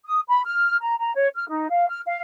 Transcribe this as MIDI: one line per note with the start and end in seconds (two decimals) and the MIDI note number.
0.06 0.21 87
0.28 0.41 83
0.44 0.76 89
0.81 0.95 82
1.00 1.13 82
1.14 1.27 73
1.35 1.48 89
1.49 1.67 63
1.70 1.86 77
1.89 2.00 89
2.06 2.22 77